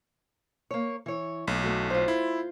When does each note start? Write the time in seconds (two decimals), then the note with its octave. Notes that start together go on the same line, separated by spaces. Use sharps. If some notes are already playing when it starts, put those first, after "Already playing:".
0.71 A#3 C#5
1.06 E3 C#5
1.47 B1 A3
1.64 A3 F#4
1.90 F4 C5
2.08 E4